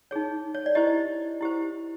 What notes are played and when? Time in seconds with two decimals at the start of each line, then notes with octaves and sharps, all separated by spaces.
0.11 D#4 G#4 C#5
0.54 C#5
0.66 D5
0.75 E4 G4 C5 D#5
1.41 E4 G4 C5